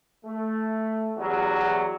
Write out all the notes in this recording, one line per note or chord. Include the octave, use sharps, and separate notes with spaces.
A3
E2 F#3 G3 F#4